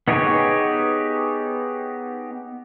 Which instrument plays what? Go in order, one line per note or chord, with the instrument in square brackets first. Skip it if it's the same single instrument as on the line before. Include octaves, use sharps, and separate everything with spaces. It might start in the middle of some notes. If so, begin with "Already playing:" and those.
[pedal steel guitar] B3 D#4 G4 G#4 C#5